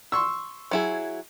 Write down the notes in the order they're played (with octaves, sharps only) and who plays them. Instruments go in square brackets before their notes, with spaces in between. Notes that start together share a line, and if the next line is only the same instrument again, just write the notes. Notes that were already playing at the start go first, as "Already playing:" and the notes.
[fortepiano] C6 C#6 E6
[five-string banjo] F#3 E4 G#4